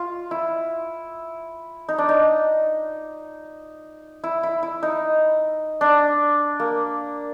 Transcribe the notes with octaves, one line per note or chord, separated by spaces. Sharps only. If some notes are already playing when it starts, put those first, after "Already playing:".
Already playing: F4
E4
D#4
D4
D#4
E4
E4
E4
D#4
D4
A#3